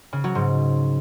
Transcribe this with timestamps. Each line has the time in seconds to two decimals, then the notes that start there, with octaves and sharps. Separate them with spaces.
0.13 C#3
0.24 F#3
0.35 G#2